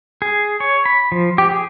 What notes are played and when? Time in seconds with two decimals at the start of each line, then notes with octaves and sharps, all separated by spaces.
0.22 G#4
0.60 C#5
0.86 B5
1.12 F3
1.38 G4
1.51 G#4